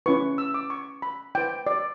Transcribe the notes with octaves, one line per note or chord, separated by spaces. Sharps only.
C#4 E4 B4 C#6
E6
D6
C#6
B5
E4 B4 G5
D5